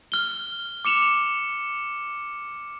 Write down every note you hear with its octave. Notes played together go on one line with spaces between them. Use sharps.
F6 G7
D6 C#7 E7 F7